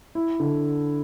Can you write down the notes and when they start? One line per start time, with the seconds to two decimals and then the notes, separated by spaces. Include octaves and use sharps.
0.15 E4
0.40 D3